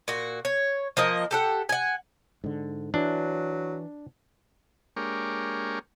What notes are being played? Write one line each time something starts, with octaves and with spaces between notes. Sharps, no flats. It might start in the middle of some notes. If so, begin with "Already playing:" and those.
A#2 F#4
C#5
F3 A#3 D#5
G4 A4 F#5
F#5 G#5
G#2 D3
E3 F#3 D4
G#3 A#3 D4 G4 A#4 C#5